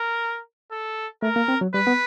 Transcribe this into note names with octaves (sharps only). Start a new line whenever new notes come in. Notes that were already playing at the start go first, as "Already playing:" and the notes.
Already playing: A#4
A4
A3 A#4
A#3
C4
F#3
G3 B4
B3